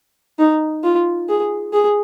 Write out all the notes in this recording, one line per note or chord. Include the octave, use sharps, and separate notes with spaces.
D#4
F4
G#4
G#4